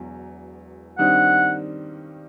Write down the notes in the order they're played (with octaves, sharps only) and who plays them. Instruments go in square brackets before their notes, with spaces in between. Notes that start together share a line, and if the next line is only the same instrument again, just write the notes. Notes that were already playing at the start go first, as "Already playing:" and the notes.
Already playing: [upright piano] E1 E2 F#3
[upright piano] G2 D#3 G3 C4 D#4 [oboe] F#5